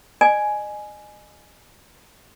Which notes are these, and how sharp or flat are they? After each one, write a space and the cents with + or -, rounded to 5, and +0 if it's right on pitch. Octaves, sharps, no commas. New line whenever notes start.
D#5 -35 G#5 +10